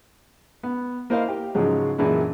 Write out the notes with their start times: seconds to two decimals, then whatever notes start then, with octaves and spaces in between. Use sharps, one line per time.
0.63 B3
1.10 A#3 E4 A#4 C5 D#5 F5
1.28 G4
1.55 G#2 C#3 F3 F#3 G#3
1.98 F#2 A#2 E3 G#3 D4 E4